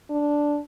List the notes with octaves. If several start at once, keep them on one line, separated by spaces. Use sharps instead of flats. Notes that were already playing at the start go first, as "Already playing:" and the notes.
D4